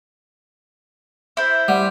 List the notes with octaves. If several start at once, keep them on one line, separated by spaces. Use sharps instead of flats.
E4 C5
G3 F#5